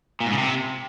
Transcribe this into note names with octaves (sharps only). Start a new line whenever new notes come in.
A#2
G#2
C#3
C3